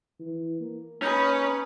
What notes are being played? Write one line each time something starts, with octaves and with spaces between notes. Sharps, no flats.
E3
A#3
C#4 D#4 G#4 B4